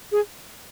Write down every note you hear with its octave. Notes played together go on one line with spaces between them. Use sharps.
G#4